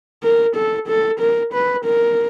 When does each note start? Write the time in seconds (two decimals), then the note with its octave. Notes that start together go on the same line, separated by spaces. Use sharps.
0.24 A#4
0.56 A4
0.89 A4
1.20 A#4
1.54 B4
1.85 A#4